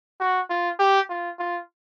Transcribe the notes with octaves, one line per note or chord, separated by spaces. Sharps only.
F#4
F4
G4
F4
F4